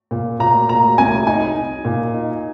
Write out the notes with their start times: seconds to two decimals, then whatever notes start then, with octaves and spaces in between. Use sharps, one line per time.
0.11 A#2
0.39 A#2 A#5
0.69 A#2 A#5
0.98 C2 G#5
1.27 D#4 G#5
1.57 D#4
1.85 A#2
2.14 D#4